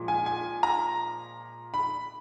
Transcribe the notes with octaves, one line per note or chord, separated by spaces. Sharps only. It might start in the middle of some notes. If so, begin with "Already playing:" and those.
Already playing: A#2 F3 G#3
G#5
G#5
A#5
B5